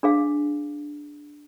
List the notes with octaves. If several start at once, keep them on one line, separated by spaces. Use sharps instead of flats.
D4 G#4 F5